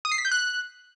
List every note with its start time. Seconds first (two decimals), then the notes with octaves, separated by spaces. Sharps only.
0.05 D#6
0.12 C7
0.18 B6
0.25 G6
0.31 F#6